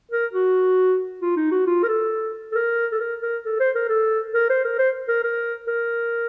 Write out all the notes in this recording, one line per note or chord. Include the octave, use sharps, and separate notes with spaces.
A#4
F#4
F4
D#4
F#4
F4
A#4
A4
A4
A#4
A4
A#4
A#4
A4
C5
A#4
A4
A#4
C5
A#4
C5
A#4
A#4
A#4